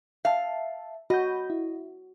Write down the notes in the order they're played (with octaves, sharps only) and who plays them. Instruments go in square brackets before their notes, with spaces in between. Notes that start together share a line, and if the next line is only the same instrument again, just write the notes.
[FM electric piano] E5 A5 [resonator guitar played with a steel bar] F5
[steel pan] F#4 [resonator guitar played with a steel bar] D#5 [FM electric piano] B5 G6
[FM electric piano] E4